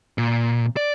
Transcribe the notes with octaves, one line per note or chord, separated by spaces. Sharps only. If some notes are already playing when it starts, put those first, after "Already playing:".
A#2
D5